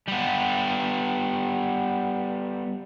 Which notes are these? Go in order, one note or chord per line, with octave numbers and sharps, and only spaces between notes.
G3 B3